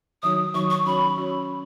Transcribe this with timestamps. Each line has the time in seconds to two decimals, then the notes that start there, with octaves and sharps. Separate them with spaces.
0.23 D#3 F#3 D#4 F#4 C#5 D#6
0.54 D#3 F#3 D#4 F#4 C#5 C#6
0.70 C#6
0.86 C#4 F#4 C#5 B5
1.18 C#4 F#4 C#5